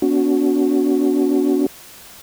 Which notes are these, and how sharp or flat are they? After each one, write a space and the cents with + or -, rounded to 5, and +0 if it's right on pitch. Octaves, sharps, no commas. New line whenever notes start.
B3 +0 D4 -40 F#4 +0